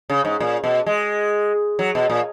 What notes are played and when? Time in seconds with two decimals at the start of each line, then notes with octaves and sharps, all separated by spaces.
0.10 C#3
0.25 G#2
0.40 A#2
0.64 B2
0.86 G#3
1.79 F#3
1.95 B2
2.10 A#2